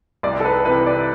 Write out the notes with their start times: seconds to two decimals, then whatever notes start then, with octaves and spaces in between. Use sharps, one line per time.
0.23 C2 D5
0.40 A4
0.45 B4
0.65 C3 E3 B4
0.86 D5